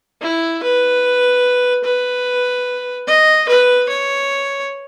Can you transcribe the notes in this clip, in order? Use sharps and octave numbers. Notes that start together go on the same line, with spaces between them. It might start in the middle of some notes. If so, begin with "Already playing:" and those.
E4
B4
B4
D#5
B4
C#5